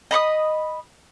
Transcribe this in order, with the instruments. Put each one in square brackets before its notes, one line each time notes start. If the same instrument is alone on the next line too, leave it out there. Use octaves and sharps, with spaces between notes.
[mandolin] D#5 B5 C#6 D#6